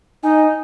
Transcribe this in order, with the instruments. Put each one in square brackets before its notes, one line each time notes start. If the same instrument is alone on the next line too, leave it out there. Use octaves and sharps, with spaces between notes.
[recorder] D#4 [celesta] G#5